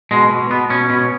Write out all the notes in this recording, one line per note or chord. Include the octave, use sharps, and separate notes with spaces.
B2 G#3
B2
B2 B3
B2 C#4
B2